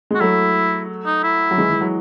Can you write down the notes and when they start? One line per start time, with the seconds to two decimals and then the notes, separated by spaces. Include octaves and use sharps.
0.11 G#3
0.15 F#4
0.20 F#3 A3 E4
1.06 D#4
1.23 E4
1.51 F#3
1.57 E3 G#3
1.70 E3
1.81 F#3